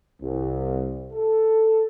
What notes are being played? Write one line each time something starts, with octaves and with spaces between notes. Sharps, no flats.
C2
A4